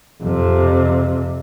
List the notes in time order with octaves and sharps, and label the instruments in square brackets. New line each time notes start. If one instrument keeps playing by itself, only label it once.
[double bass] F2 C3